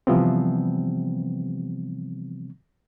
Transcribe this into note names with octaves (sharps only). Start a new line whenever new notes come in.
C3 E3 F3 G3 B3 C4